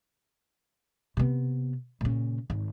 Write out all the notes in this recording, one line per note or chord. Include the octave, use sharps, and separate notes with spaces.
C3 B3
A#2 C#3
G#1